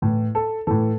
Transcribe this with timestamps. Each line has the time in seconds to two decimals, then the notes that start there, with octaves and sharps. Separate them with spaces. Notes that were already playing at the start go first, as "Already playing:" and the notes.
0.02 A2 E3
0.35 A4
0.67 A2 E3 A4